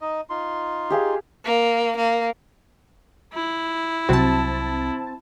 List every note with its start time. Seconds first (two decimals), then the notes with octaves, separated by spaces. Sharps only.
0.01 D#4 D#5
0.30 D#4 F4 C6
0.90 G4 G#4 F5
1.45 A#3
1.96 A#3
3.34 E4
4.09 C2 C3 F#3 C4 F#4 A5